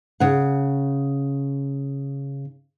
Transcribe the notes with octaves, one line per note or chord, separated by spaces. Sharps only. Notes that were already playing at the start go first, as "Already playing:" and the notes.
C#3 F#5